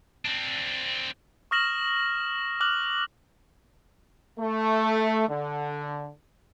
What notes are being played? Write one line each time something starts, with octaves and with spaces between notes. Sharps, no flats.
C4 D4
C#6 D#6 F6 A#6 E7 F#7
D6 F6 F#6 F#7
A3
D3